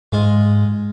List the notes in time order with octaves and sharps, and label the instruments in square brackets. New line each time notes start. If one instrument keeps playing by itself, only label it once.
[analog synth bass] G#2 [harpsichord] G#3 F4 D#5